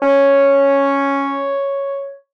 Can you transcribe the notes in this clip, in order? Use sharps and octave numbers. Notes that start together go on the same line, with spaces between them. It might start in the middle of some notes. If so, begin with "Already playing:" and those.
C#4 C#5